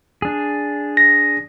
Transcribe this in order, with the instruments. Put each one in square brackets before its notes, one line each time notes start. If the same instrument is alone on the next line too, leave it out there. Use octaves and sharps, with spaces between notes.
[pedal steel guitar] D4 G#4
[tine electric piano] A#6